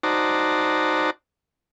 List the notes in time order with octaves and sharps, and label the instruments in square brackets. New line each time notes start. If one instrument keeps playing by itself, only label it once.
[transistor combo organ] D#4 F#4 C5 D5 A5 A#5